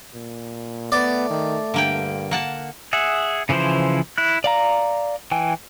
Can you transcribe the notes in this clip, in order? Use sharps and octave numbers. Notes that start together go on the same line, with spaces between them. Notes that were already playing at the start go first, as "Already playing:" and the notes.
A#2
A3 B3 D5
D#3
G2 D3 A#3 G5
A#3 F#5 A5
G#4 E5 F#5
C#3 E3 F3 E4 C5
E4 F#6
D5 F5 A#5
E3 G5 G#5